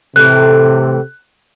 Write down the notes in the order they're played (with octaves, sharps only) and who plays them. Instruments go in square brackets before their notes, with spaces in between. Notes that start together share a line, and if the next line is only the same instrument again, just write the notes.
[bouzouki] A2 E3 [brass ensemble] C3 [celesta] F#6